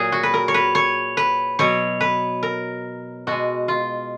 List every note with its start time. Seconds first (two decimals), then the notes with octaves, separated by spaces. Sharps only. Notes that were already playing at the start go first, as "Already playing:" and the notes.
Already playing: A#2 F#3 G#4
0.12 F#4
0.23 B4
0.34 A#4
0.48 C#5
0.54 B4
0.75 C#5
1.17 B4
1.59 B2 F#3 C#5
2.01 B4
2.43 A#4
3.27 B2 G#3 F#4
3.68 F4